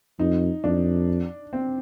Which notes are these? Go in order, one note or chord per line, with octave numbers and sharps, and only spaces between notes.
F2 D#4
F2 D4
C4